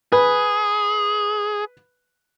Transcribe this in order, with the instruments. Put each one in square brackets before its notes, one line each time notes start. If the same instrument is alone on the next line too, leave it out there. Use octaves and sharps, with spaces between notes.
[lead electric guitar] G#4 [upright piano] B4 B5